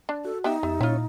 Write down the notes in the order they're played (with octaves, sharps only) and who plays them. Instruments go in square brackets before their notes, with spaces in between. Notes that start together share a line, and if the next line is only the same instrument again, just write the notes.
[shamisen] D4
[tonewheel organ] F#4 [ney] A4
[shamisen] B3 G4 E5 [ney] D#4
[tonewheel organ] F2 G4 E5 [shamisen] B3
[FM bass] A#2 [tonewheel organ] C#4 C#5 [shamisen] E4 F4